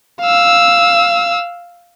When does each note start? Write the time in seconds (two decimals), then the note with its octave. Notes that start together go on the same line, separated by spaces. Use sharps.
0.21 F5 E6